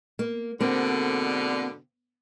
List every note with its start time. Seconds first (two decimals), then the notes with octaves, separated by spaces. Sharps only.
0.19 A#3
0.61 G#2 B2 D3 A#3 C4